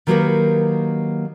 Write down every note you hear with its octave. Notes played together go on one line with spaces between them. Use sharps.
D#3 F#3 A#3 G4 B4 C#5